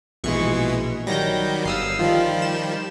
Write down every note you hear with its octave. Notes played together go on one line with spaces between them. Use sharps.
A#1 B2 E3 G#3 C#6
D#3 F#3 G3 G6 A#6
G1 F5 D#6 E6 C7
D#3 F3 G3 F4
E7